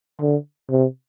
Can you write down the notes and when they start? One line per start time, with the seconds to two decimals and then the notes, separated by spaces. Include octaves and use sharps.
0.21 D3
0.70 C3